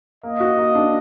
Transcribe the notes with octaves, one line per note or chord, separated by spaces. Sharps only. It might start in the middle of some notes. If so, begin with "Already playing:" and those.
A#3 D#5
F#4
A#3
D4